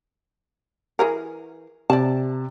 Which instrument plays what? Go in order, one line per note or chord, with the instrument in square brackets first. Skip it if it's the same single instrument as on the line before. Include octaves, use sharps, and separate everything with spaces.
[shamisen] E3 G#4 A#4
[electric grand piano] C3 [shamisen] D5 A5